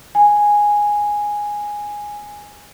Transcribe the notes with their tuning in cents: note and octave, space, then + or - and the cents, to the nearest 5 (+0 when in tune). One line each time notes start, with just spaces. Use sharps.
G#5 -5